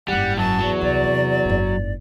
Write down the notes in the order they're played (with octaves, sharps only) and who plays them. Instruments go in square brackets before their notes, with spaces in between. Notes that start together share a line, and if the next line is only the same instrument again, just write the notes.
[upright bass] F#1 G#2 [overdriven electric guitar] G3 [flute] F#5
[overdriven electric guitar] F#2 F#3 [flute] A5
[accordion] E2 [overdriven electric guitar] F#3
[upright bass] C2 [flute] D5
[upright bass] C3
F#1 G#2